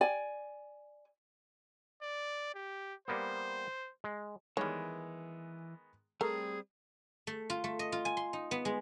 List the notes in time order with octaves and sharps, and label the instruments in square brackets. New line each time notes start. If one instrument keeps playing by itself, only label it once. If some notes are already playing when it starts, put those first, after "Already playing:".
[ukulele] D5 G#5
[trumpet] D5
G4
[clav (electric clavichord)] G3 A#3 B3 [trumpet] C5
[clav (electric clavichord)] G#3
[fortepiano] D#3 G#3 B3 [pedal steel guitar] E3 [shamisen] G3 C#5
[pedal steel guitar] G3 C4 [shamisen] A3 A#4 [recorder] G#4
[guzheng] A3
F4
A3
D#5
F4
G#5
C6
D#4
B3
G#3